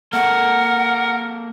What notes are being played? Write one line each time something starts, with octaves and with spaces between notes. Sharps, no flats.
A#3 A4 A#4 F#5